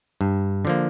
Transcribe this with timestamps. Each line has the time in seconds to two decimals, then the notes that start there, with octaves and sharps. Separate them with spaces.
0.21 G2
0.65 D3 F3 A#3